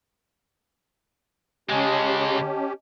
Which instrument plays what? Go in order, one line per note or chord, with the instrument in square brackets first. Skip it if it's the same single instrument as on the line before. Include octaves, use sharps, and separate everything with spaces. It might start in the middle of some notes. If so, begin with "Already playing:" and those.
[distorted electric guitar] C#3 G#3 [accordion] C#4 G4 [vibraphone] D#5 G#5 A5